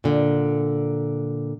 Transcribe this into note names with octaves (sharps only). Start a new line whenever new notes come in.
A#2 D3